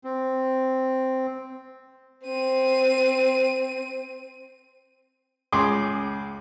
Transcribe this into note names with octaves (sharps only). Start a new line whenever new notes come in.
C4
C4 D#7
C#2 G#4 C6 D6